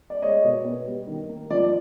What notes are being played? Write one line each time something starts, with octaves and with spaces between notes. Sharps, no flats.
D5
G#3 C#5 D#5
B2
B3
G3
D#3
A#3
F3 D5